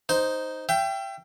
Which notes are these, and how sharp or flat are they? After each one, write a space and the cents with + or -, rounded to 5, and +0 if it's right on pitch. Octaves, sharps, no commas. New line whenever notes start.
D#4 +0 C5 +0
E5 +40 G5 +0